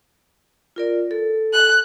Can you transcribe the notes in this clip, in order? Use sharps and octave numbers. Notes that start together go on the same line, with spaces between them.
F4 A#4 D5
A4
F#6